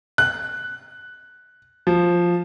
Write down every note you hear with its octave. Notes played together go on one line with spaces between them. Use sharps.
F#6
F3